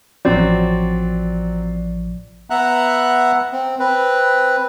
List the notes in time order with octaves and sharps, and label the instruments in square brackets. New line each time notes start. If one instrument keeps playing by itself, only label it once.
[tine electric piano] A1 F3 [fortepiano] F#3 C4 [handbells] D5
[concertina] B3 E5 F#5 A#5 F#6
C4
C4 B4